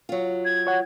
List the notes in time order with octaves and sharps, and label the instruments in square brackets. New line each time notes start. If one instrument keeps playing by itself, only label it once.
[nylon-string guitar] F#3 F4
[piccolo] G#6
[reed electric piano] C#5 F#5